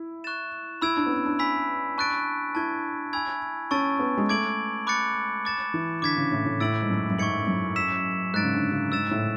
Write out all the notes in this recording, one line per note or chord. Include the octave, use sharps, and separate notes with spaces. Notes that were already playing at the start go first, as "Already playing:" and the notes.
Already playing: E4
C#6 F#6 A6 E7
E4 B5 E6 G#6 D7
D4
B3
C#4
D4
G#5 B5 E6 B6
A5 C#6 F#6 A6 D7
E4 A5 C#6 G#6
G#5 B5 E6 G#6
C#4 A5 C#6 E6 A6 D7
B3
G#3
A3 D6 G#6 D7 F#7
B5 D6 F#6 A6 C#7
A5 D6 A6 E7
E3
D3 D6 G#6 B6
C#3
A2
A2
A2 E6 A6 D7 F#7
G#2
F#2
F#2
G#2 C#6 G#6 C#7 F#7
F#2
E6 B6 E7
G#2 F#6 A6 D7
C#3
D3
C#3
G#2 E6 A6 E7
A2